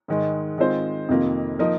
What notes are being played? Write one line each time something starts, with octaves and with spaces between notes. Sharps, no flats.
G#2 D#3 G#3
D#3 G#3 C4 F4 C5
F2 C3 D#3 A#3 F4
F3 A#3 D#4 A#4